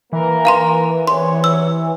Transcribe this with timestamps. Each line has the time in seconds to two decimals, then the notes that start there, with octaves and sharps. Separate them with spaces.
0.13 E3 A#3 A#4
0.45 F5 A#5 C6
1.07 E2 C3 C#5 C6
1.44 E6